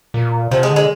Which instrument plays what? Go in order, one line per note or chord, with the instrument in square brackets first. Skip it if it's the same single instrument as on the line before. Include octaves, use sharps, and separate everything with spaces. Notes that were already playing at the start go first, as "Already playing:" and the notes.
[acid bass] A#2
[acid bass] C3 [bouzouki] F3
[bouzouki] G#3
[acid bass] D3
[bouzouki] G#3